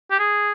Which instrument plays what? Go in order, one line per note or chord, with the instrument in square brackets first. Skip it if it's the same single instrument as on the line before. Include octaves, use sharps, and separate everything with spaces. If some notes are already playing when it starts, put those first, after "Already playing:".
[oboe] G4
G#4